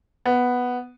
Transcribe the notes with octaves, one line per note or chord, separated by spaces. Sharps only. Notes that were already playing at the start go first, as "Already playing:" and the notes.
B3